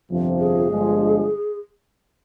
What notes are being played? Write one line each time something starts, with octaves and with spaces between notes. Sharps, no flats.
G1 F2 C3 F3
G#4
G1 G2 F3 G#3